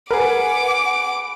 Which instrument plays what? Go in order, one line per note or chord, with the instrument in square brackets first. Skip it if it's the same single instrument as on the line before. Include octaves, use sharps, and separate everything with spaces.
[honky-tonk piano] G#4 B4 [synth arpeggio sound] A#4 [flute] F#5 [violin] D6